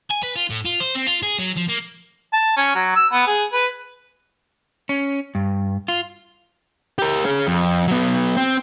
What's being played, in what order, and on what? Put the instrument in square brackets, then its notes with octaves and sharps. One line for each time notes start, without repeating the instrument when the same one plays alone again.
[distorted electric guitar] G#5
B4
F4
A2
F4
C5
C4
F4
G#4
F#3
F3
A#3
[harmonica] A5
C#4
F#3
E6
B3
G#4
B4
[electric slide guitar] C#4
G2
F4
[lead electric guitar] G4 A#4
G#4 C#5
F2
F#3 B3
C4